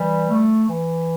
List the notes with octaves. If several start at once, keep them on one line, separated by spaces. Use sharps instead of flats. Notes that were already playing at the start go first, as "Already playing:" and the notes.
Already playing: E3 G3
A3
E3